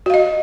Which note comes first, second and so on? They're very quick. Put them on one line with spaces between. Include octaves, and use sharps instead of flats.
F#4 F5 D#5